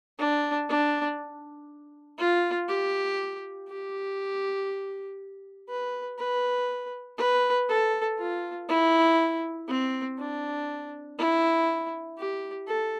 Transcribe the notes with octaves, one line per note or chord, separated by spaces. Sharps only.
D4
D4
F4
G4
G4
B4
B4
B4
A4
F4
E4
C4
D4
E4
G4
A4